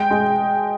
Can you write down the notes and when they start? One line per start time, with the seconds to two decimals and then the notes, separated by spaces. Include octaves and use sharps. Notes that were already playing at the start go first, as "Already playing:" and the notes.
Already playing: G#3 G5
0.10 G#3